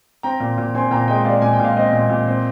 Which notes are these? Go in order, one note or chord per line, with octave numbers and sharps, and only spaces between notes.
C4 G5 A#5
A#2
A#2
C4 G#5 C6
A#2 G5 A#5
G#3 D#5 G5
G#3 D5 F5
A#2 G#5
G5
A#2 F5
C4 D#5
A#2
A#2
C4